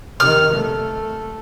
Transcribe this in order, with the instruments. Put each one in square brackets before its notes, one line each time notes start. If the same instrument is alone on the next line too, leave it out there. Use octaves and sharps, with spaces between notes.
[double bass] C3 D#3 [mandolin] F6
[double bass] A3